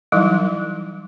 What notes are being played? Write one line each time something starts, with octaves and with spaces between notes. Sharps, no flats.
E3 F#3 G3 D#4 E4